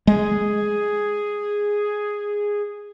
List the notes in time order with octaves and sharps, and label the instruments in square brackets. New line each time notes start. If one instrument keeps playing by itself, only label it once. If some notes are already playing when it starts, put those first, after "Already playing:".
[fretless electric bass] G#3 [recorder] G#4